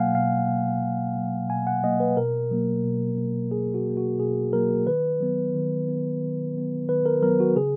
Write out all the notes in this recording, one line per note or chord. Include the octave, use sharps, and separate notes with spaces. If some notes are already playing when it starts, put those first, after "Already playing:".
Already playing: B2 F#3 A#3 F5 F#5 G#5
B2 F5
F#3 A#3
B2
F#3 A#3
B2 G#5
F#5
F#3 A#3 D#5
B4
B2 A#4
F#3 A#3
B2
F#3 A#3
B2 G#4
F#4
F#3 A#3
F#4
B2 G#4
F#3 A#3 A#4
D#3 B4
F#3 B3
D#3
F#3 B3
D#3
F#3 B3
D#3 B4
A#4
F#3 B3 A#4
F#4
C#3 G#4